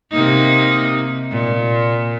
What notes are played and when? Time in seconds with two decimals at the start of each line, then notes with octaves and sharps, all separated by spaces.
0.11 C3 A#3 D#4
1.31 A#2